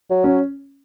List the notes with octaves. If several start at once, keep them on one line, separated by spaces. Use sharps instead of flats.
F#3
C#4